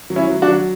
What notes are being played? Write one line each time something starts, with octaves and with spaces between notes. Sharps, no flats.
F#3
C#4 E4
F#3
D4 F#4
F#3